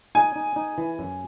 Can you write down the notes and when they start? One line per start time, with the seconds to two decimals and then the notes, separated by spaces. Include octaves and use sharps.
0.15 D#4 G#5
0.36 D#4
0.56 D#4
0.78 E3
0.99 F#2